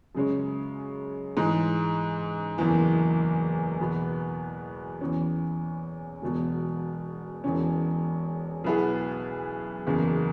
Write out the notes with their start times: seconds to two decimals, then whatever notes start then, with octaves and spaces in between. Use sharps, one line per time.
0.15 F#2 C#3 G#3 C#4
1.37 G#2 E3 G#3
2.58 F#1 E2 E3
3.79 E2 B2 B3
5.01 E2 E3 C#4
6.22 E1 E2 B2 F#3
7.44 E1 E2 E3 C#4
8.64 B1 B2 B3 E4 G#4
9.87 F#1 E2 C#3